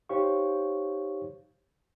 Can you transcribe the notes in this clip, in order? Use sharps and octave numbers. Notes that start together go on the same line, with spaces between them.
D#4 G4 C5 C#5 F5 C#6